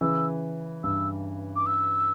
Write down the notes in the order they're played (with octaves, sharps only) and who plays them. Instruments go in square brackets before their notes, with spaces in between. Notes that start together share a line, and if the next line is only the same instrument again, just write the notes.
[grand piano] C#3 E3 [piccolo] E6
[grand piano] G2 [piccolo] E6
[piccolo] D6
E6